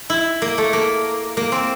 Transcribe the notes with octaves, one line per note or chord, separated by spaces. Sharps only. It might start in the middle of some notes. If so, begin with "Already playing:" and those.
E4
A#3
A3
A#3
A#3
C4